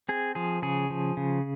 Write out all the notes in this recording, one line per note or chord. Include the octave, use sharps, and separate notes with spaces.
C4 G#4
F3 G#4
C#3 G#4
F3
C#3